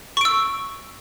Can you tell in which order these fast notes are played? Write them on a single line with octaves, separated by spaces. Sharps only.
C#6 D7 E6